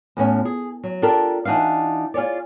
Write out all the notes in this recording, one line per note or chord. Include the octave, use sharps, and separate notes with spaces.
E2 A2 C#4
G#4
F#3
D4 F4 G4 A4 A#4
E3 D4 D#4 F#4 F5
F4 G#4 C#5 D5